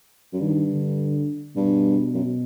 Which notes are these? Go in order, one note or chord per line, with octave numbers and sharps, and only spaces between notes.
F#2
G2 D#3
D3
G2 B2
F#2